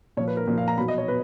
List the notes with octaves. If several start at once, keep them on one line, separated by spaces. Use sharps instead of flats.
A#2 F3 C#5
B4
A#4
A#2 F3
F5
A#5
B2 F#3 B5
D#5
C#5
B2 B4